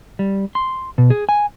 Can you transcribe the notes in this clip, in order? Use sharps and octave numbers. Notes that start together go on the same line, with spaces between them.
G3
C6
B2
G#4
G#5